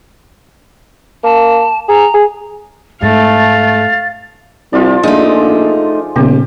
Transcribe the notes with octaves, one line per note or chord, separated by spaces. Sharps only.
A#3 A5
G#4 A#5
G#4
G#2 A3 F5 A6
C2 F3 F4 D5
A#1 G#3 A3 D#4
D#1 A#2 C#3 B3 G4